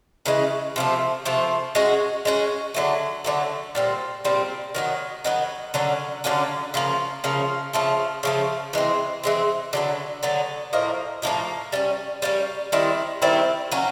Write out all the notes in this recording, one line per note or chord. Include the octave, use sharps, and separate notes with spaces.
C#3 E3 G#3
C3 F3 A3
C3 F3 A3
G#3 C#4 F#4
G#3 C#4 F#4
D3 F#3 A3
D3 F#3 A3
A#2 G3 C4
A#2 G3 C4
D#3 F#3 B3
D#3 F#3 B3
D3 F#3 A#3 C#4
D3 F#3 A#3 C#4
C#3 F3 A#3
C#3 F3 A#3
C#3 F3 A3
C#3 F3 A3
E3 G#3 C4
E3 G#3 C4
D3 F#3 B3
D3 F#3 B3
A2 F3 A#3 D#4
A2 F3 A#3 D#4
G3 A#3 C#4
G3 A#3 C#4
D#3 G3 C4 E4
D#3 G3 C4 E4
F#3 A#3 C#4